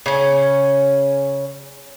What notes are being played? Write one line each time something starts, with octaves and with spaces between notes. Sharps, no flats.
C#3 C#4